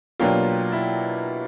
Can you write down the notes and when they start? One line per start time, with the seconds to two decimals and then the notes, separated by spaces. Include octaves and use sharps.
0.19 B2 F#3 A#3 D4 F4 G4
0.72 E4